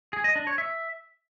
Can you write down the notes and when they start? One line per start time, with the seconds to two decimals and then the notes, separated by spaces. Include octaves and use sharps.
0.13 G#4
0.24 D#5
0.36 D4
0.47 C#5
0.58 E5